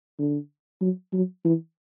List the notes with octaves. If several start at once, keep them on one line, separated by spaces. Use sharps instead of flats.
D3
F#3
F#3
E3